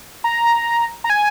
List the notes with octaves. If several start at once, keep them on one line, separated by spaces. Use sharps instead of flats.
A#5
A#5
G#5